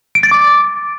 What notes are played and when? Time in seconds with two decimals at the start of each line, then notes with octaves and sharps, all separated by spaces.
0.15 D7
0.23 A6
0.31 D6